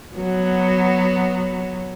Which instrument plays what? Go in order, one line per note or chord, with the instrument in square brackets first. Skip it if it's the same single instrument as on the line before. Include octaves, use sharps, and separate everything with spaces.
[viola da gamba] F#3 B3